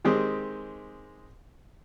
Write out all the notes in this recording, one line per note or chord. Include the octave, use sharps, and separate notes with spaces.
D#3 G#3 C4 G4 G#4